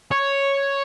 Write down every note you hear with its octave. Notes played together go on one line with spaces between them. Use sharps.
C#5